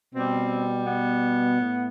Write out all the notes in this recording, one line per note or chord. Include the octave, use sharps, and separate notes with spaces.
B2 G3 C4
B3
A2